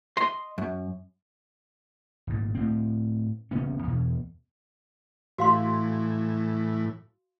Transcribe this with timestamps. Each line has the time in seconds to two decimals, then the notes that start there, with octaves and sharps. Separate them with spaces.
0.17 D#5 C6
0.58 F#2
2.27 G#1 A#2
2.55 A2 C4
3.51 D#1 C#3 B3 C#4
3.83 E2 B2
5.38 A2 E3 F#4 F5 C6